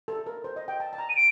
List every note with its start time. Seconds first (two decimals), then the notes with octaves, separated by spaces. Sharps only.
0.08 A4
0.26 A#4
0.44 C5
0.56 D#5
0.68 G5
0.80 A5
0.93 A5
0.98 A#5
1.09 D#7
1.16 D7